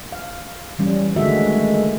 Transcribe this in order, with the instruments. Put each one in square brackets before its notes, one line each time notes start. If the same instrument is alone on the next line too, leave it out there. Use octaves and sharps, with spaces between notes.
[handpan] F5
E3 G3 C#4
[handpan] D3 F#4 E5 [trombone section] D#3 G#3 A3